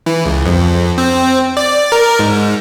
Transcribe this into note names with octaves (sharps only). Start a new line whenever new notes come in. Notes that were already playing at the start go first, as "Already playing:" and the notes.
E3
C#2
F2
C4
D5
A#4
G#2